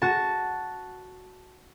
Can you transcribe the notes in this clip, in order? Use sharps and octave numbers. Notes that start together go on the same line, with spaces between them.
F#4 A5